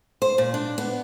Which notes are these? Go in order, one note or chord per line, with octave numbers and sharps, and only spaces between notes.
C5
A#2
D4
B3